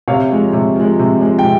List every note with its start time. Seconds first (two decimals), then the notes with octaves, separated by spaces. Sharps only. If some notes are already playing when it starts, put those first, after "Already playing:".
0.08 C3 C#5 F5
0.31 F3 G#3
0.53 C3
0.76 F3 G#3
0.99 C3
1.21 F3 G#3
1.39 G5
1.44 C3